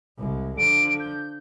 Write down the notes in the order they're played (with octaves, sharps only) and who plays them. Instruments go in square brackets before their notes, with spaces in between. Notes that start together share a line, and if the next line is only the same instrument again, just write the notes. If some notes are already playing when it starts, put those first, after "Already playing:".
[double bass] C2 G#3
[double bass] D3 F3 [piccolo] D7
[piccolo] G6